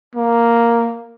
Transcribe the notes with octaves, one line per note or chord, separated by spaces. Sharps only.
A#3